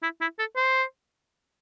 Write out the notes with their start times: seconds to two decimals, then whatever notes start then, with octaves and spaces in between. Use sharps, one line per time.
0.03 E4
0.21 E4
0.39 A4
0.56 C5